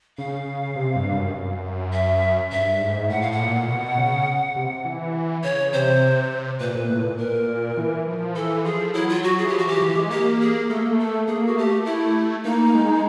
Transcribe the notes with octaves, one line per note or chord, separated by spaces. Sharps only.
C#3 F5
C3
G2
F#2
F#2
E5
G2 E5
G#2
A2 F#5
F5
F#5
A#2
B2
C#3
C3
E3
C#3 C#5
C3 C5
A#2 B4
A#2
A2
A#2
A#2 A#4
E3
F3
E3 A4
F3 G#4
F#3 E4
F4
F#4
G#4
E3
F3 G4
F#4
E3 G4
E3
G#3
A#3 G4
G#4
A3 A4
A#3
A3
A4
A#3 G#4
F#4
A3 G4
E4
A#3 D#4
G#3